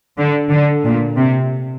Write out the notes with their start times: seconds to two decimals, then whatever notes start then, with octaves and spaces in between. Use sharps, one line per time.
0.18 D3
0.51 D3
0.85 A#2
1.17 C3